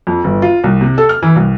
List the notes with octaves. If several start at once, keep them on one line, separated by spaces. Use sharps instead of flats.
F2
G1
F4
C2
C3
A4
F6
E3
C2